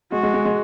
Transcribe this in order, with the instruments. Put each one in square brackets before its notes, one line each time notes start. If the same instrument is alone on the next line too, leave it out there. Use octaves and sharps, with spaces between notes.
[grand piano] G#3 [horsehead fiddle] F#4
[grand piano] G#3
G#3
G#3